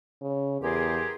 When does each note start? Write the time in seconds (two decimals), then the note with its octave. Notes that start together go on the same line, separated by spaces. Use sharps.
0.21 C#3
0.62 E2 G4 G#4 A#4 C6